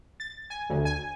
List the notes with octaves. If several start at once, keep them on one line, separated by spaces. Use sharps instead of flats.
A6
G#5
D2
G#5